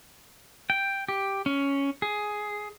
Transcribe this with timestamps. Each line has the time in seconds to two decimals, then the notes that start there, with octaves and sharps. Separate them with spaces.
0.70 G5
1.08 G4
1.46 C#4
2.02 G#4